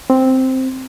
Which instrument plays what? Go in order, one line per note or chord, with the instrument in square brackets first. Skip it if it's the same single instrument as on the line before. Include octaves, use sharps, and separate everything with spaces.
[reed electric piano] C4